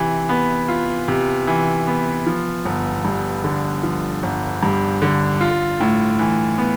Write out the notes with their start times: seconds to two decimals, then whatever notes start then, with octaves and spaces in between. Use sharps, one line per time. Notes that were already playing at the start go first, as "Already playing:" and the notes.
Already playing: C3 E3
0.29 B3
0.68 F4
1.08 C3
1.47 E3
1.87 B3
2.26 F3
2.65 G1
3.05 G2
3.44 D3
3.83 F3
4.23 G1
4.63 G2
5.02 D3
5.41 F4
5.80 A2
6.19 E3
6.58 B3